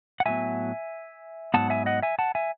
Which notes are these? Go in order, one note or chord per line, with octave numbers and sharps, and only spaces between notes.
F#5
A2 F#3 B3 E5 G#5
G#2 F#3 B3 F#5 A5
E5 G#5
D#5 F#5
E5 G#5
F#5 A5
E5 G#5